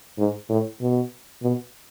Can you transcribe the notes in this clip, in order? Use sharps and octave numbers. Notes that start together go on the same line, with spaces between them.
G#2
A2
B2
B2